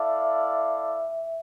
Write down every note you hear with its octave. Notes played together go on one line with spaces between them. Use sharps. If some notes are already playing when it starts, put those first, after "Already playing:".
Already playing: E4 A4 D5 E5 F5